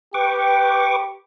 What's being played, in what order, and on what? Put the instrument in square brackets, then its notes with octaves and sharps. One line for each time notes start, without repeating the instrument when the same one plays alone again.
[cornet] G4 [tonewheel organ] B4 C#6 D6 [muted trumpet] G5